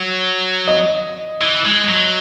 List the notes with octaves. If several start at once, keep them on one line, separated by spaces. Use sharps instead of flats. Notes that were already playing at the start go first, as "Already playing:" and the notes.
Already playing: F#3
D#5
E3
G#3
F#3